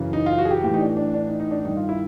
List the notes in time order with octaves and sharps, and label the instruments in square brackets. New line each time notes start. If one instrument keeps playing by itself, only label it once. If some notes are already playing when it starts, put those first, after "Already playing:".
Already playing: [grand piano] F#2 C#3 E3
D#4
F4
F#4
G#4
G4
A2 E3 G4
D#4
D4
D4
D4
D#4
D#4
D4
G2 D#3 D#4
F4
E4